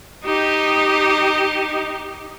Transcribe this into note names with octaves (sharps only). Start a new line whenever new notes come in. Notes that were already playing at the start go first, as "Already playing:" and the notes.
D#4 G4